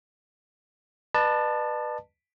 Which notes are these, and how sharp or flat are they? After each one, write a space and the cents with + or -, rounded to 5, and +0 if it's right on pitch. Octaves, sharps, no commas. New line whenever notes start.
B4 -10 D5 +45 A5 +5